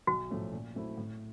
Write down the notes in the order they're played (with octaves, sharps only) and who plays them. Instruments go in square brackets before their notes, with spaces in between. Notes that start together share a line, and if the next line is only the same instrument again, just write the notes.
[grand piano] B1 [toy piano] F#4
[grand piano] A2 F3 A3 C#4
A#2
F#3 A3 C4 E4
A2